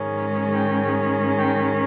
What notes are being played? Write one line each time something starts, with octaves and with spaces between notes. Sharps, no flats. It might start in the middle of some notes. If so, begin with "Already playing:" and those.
Already playing: G#2 D#3 G#3 C#4
G5
G5